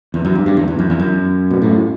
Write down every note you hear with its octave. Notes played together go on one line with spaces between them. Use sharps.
E2
F#2
G2
G2
E2
E2
F#2
E2
F#2
B2
A2